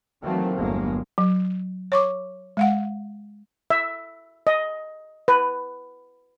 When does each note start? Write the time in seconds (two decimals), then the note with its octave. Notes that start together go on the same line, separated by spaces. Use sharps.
0.23 D#3 E3 F#3 A3 A#3 C4
0.57 G1 E2 F#3 G#3 A#3
1.18 F#3
1.92 C#5 C#6 D6
2.57 G#3 F5 F#5
3.70 E5
4.47 D#5
5.28 B4